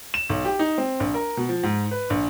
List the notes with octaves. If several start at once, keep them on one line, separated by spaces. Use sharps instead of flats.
E7
B1
G4
D#4
C4
A#1
A#4
B2
F3
G#2
B4
A#1